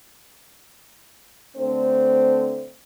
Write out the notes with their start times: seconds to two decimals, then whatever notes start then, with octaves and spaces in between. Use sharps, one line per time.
1.57 D3 A3 C4 D4 C5